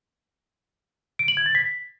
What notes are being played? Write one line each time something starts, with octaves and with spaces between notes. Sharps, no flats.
D7
F#7
G#6
A6
B6